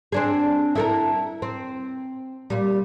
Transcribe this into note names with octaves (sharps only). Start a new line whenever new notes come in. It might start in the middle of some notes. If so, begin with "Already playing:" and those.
C4 D4 G#4
E4 A4 A#4
C4
A#2 G3